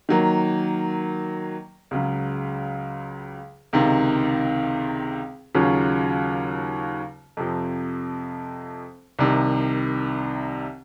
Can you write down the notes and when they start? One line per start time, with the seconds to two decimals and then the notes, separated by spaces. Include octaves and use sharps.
0.09 D#3 F#3 A#3
1.91 C#2 C#3 F#3
3.73 C#2 C3 D#3
5.55 D#2 C#3 F#3 C#4 F4
7.37 F2 C3 F3
9.19 C2 C3 D#3